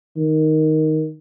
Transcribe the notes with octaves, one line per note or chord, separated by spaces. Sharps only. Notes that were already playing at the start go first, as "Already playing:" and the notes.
D#3